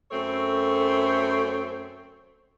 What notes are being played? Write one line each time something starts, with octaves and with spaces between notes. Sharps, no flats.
F#2 A3 C4 A4 C#5